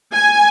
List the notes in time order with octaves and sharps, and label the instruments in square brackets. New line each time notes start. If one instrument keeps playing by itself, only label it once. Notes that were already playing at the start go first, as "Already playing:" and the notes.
[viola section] G#5